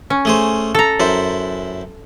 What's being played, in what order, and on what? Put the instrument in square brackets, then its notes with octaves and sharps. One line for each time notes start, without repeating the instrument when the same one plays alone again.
[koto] C#4
[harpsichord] A3 G#4 C5
[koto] A4 A#5
[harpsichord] F#2 E4 C5